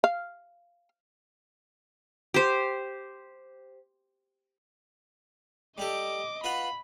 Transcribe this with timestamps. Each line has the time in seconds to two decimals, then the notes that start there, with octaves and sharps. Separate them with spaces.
0.04 F5
2.34 G4 C5
5.78 G3 G4 A4 D#5 D6
6.44 F4 F#4 B4 B5